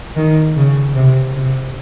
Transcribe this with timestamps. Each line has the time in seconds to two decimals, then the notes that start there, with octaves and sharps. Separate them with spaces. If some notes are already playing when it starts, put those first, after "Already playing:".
0.16 D#3
0.56 C#3
0.95 C3
1.35 C3